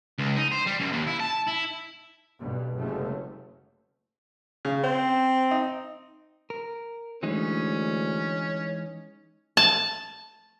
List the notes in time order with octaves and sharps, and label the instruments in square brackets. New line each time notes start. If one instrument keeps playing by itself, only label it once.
[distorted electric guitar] C#2
D#4
C5
G3
F#2
D#2
E4
A5
E4
[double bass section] B1 G2 B2
F#1 F#2 C3 G#3 A3 C#4
[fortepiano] C#3
[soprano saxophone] C4 [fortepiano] C5
[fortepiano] D#4
[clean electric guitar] A#4
[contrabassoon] D2 [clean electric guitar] E3 G#3 D#4 [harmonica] C#4
[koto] A5